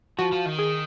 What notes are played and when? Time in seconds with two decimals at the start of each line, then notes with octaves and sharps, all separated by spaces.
0.19 F3 F#4
0.32 F3
0.46 D#3
0.59 G#4